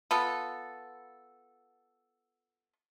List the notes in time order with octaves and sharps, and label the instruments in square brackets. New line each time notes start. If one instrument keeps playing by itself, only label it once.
[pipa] B3 F4 A4